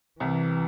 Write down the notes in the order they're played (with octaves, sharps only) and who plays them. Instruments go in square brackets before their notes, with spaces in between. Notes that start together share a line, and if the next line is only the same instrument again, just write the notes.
[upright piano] C2 C3 [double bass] E3